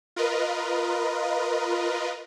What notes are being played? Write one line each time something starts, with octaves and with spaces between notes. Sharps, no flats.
F4 A#4 B4 D#5